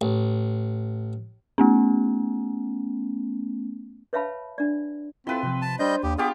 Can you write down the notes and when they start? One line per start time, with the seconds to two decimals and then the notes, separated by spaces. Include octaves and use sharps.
0.01 A1
1.58 A3 B3 C#4
4.13 B4 C#5 E5 F5 A5 B5
4.58 D4 D5
5.27 C4 E4 F4 A4 B4 C6
5.43 C3 F3
5.62 A5
5.79 G3 D4 C5 D#5 G6
6.03 D#2 G4
6.18 B3 F4 G4 G#4 D6